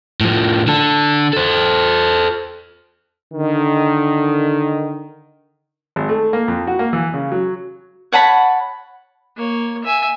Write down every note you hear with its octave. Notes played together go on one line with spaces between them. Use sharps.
A2 F3
D3 A4
A4 C5
D3 D#3
G#1
A3
A#3
F2
F#4
A#3
E3
C#3
F#3
C#5 F#5 A5 B5
A#3 C#5
E5 G#5